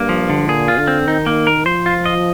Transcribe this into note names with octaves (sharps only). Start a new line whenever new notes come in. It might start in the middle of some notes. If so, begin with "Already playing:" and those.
Already playing: G2 A#3
F3
D3
A#2 G#4
F4
D3
C4
D#3 D#4
A#3
A#4
F3 C5
F4
D#5